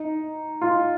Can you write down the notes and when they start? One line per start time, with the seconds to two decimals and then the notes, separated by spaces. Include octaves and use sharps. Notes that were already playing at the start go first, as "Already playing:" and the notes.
Already playing: D#4
0.61 F4